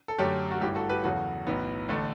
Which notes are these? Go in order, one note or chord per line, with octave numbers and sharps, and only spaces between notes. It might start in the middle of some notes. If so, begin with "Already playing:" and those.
A4
F#2 D3 A3 C#4 G4
F#4
A1 G2 E3 G4
F#4 A4
G4 B4
E2 C#3 F#3 F#4 A4
B1 A2 E3 B3
A1 D3 A3